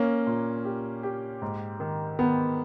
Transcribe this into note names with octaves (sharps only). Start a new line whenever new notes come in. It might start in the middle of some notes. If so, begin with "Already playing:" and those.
Already playing: A#3 C#4
A#2
G4
G4
G#2
D#3
D#3 B3